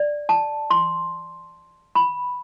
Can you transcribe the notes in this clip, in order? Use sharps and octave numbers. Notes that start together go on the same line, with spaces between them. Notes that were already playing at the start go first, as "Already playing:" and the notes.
Already playing: D5
A5
C6
B5